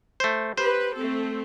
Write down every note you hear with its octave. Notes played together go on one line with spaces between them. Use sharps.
A3 C5
G4 B4 C5
A3 C4 A4